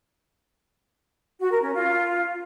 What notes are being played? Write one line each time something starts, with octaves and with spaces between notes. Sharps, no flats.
F#4
A#4
C#4
F4